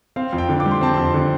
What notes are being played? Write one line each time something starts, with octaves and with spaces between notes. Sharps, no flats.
C4 F5
F2
G5
D3
D6
G3
C6
C4 A5
F2 C6
D3